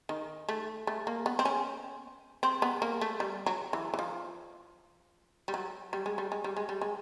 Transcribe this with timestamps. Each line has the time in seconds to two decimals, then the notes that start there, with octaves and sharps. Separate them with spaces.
0.09 D#3
0.49 A3
0.87 A3
1.07 A#3
1.26 B3
1.39 C4
1.45 C#4
2.43 C4
2.62 B3
2.82 A#3
3.01 A3
3.20 G3
3.46 F#3
3.73 E3
3.94 E3
3.99 F3
5.48 G3
5.54 F#3
5.93 G3
6.06 G#3
6.18 G3
6.32 G#3
6.44 G3
6.57 G#3
6.69 G3
6.81 G#3